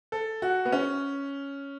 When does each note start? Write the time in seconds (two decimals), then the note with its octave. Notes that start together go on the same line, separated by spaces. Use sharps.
0.12 A4
0.42 F#4
0.65 B3
0.72 C#4